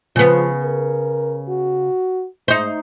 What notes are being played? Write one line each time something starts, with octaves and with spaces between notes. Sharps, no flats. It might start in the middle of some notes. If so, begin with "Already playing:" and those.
C#3 F3 B3
A#4
F#4
G#2 D#4 C5